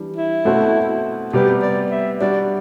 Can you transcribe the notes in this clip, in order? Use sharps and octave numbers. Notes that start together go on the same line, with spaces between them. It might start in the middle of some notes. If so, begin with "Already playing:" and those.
Already playing: E3 G3 D4
E4
B2 A3 C4 F#4 A4
C3 G3 B3 G4
D5
E5
G3 D4 F#4 D5